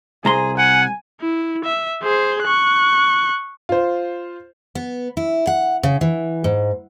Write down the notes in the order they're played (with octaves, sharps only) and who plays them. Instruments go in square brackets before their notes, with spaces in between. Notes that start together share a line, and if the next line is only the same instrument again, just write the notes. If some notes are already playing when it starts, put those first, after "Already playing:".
[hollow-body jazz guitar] C2 A#5 C6 [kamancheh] G#4
[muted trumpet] F#5 [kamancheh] G#5
[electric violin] E4
E5
G#4 C5
C#6 F#6
[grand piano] F4 C5
[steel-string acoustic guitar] B3
E4
F#5
C#3
E3
G#2